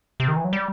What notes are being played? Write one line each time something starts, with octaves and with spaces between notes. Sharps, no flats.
C3
D#3
E3
F#3
G3